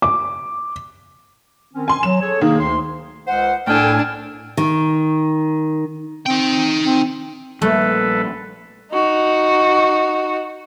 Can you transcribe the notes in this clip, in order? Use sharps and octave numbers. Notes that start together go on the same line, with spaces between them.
D6
D#3 C4 C#4
G#5 C6
F#3 E7
G#4 A4 C#5
D#3 A#3 G#4
D2 C6
C#2 C5 F#5
C2 A2 D4 A4 G5 G#5 F6
D#3
C4 D#4 G5
C4
A#1 G3 A3 A#3 A4 B4
D#4 F#4